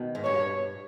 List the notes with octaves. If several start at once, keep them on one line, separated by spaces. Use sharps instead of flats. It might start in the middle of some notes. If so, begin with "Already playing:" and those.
Already playing: B2 D#3
G#2
G2 C#5